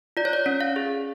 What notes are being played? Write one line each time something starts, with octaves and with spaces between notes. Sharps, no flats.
F4 D5
C#5
D5
C#4
F5
G#4